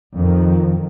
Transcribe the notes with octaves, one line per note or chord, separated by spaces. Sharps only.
F2 D#3 F3